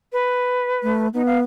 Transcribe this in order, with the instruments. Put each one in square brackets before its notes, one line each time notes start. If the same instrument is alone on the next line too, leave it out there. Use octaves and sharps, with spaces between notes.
[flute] B4
[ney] A3
[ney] B3 [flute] D#4
[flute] F5